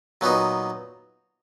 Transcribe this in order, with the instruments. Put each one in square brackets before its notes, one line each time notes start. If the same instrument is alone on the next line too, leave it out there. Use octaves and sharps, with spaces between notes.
[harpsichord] A#2 F#3 B3 D#4